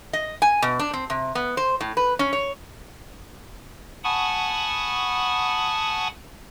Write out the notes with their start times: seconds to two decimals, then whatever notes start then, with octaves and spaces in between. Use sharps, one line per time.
0.13 D#5
0.42 G#5
0.62 B2
0.79 D4
0.93 C4
1.10 C3
1.35 B3
1.57 C5
1.81 A2
1.97 B4
2.19 C#4
2.33 C#5
4.04 F#5 G#5 A5 B5 C#6 D#6